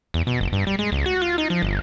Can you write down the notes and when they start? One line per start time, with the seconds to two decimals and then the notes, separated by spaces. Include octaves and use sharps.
0.14 E2
0.27 B2
0.41 F#1
0.52 G2
0.67 G3
0.79 G#3
0.92 C#2
1.06 F#4
1.22 F4
1.38 D#4
1.50 F3
1.62 G1